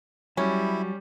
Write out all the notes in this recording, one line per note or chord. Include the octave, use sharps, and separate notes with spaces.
F#3 G3 C#4 E4